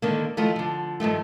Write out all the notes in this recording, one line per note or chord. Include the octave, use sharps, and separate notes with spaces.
D3 D#3 A#3
D#3 F3 A3 E4 F4
D3 F3
G2 D#3 F3 A3